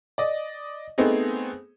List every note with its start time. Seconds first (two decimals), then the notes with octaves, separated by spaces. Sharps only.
0.18 D5 D#5
0.98 A3 B3 C4 D#4 G#4